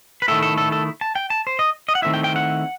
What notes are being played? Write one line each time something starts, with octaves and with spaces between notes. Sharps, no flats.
B4
D#3 A3 E4 A4
A4
A4
A4
A5
G5
A5
C5
D#5
D#5
F#5
D#3 A3 C4 E4 E5
G5
G5
F#5